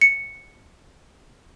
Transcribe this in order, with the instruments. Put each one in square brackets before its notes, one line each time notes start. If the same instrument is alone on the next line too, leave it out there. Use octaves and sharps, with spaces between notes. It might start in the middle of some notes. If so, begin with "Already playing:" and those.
[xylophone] C#7